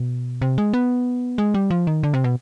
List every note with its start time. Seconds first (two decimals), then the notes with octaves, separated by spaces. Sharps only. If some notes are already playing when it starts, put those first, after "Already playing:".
Already playing: B2
0.42 C3
0.58 G#3
0.74 B3
1.38 G#3
1.54 G3
1.71 F3
1.87 D#3
2.03 D3
2.14 C3
2.24 B2